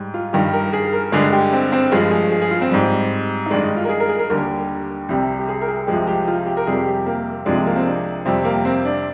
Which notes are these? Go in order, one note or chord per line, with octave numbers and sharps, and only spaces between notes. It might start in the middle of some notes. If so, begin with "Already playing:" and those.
Already playing: G#2 G3
F4
G2 D#3 G3 G4
A#4
G#4
A#4
G2 D3 G#3 G#4
G4
C4
C4
G2 F3 G#3 G#4
G#4
G#4
G#4
F4
C4
G#2 G3
D#4
G2 D#3 G#3 D4
D#4
F4
A#4
G#4
A#4
G#4
A#4
D#2 D3 G3 A#4
C2 C3 G3
G4
G#4
A#4
G#4
C2 C3 F3 G#3 G4
G4
F4
G4
A#4
F2 C3 G3 G#4
G4
A#3
C2 C3 F3 G#3 D4
A#3
C4
D4
F2 C3 G3 C4
A#3
C4
D4